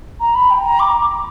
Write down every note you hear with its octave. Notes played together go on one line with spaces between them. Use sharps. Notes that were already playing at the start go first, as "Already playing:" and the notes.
A#5
B5
G5
A#5
D6